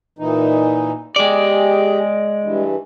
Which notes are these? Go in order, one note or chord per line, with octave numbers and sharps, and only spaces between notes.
A#2 E3 D#4
G#3 G4 G#4 D5
G2 E3